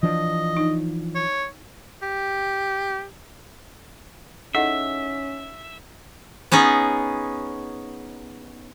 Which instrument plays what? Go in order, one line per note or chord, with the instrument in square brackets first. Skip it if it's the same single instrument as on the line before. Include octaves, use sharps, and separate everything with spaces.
[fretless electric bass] E3 F3 D4 [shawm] D#5
[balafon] D#4
[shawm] C#5
[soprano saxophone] G4
[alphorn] C#4 [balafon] D#4 A4 D#5 [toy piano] E4 G#4 F#5 [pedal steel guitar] E5
[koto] B3 C#4 D#4 G#4